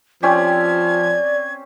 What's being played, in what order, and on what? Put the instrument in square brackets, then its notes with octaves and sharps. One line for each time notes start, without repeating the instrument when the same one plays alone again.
[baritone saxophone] F3 [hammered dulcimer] C4 C#4 G4 [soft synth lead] D5 [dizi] G#6